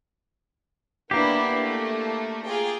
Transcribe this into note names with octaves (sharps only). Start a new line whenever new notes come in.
A#3 B3 D4 E4 G4
A3
F4 G#4 G5